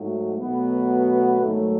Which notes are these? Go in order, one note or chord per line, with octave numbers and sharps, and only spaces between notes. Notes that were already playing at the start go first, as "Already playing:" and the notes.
Already playing: G#2 F#3 A3
B2 F#3 A3 B3
G#2 D#3 F#3 A3